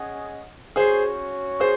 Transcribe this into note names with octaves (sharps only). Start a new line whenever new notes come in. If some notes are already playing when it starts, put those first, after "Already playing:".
Already playing: C#4 G#4 D#5 F#5
C#4 F#4 G#4 C5 C#5
G#4 C5